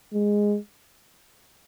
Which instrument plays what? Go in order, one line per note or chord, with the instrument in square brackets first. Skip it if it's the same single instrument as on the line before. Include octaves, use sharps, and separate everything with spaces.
[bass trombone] G#3